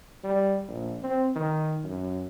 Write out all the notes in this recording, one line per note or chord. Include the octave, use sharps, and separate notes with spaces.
G3
A#1
C4
D#3
F#2